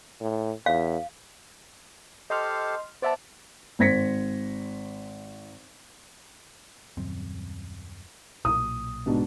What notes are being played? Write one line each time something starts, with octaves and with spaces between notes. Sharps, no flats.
A2
E2 F5
G4 A4 C5 D#5 C6 F6
B3 C5 D5 E5 A5
G#1 C5 G#6 A#6 B6 C#7
D#1 F#2 C4
B1 A#2 D#6
G#2 B2 D4